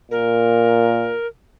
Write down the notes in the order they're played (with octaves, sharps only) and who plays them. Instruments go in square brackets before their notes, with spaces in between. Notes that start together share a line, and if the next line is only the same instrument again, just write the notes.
[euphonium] A#2 [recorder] A#4